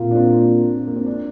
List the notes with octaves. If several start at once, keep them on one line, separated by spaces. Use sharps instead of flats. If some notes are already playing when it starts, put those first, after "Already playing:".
Already playing: A#2 A#3 C4 F4
D4
C4
A#3
C4
D4